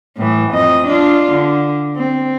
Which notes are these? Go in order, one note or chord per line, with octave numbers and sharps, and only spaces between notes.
A2 E3
F2 D#5
D4 F4
D3
C4